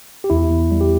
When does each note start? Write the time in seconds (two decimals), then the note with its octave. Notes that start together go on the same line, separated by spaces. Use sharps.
0.24 G4
0.30 E2 E4
0.50 E2
0.71 G3
0.81 G4